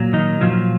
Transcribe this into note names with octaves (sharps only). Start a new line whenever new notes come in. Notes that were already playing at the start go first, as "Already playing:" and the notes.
Already playing: A#2 F#3
D#3 D#4
A#2 F3 F#3 F4